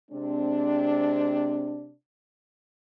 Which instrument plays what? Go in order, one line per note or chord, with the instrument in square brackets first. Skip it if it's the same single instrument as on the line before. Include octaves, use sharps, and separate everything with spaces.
[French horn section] C3 G#3 C4 D4